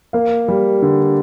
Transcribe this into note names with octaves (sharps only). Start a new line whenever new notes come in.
A#3 F5
G3
D3